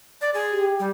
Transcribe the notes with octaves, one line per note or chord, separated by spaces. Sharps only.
D5
G#4
G4
G3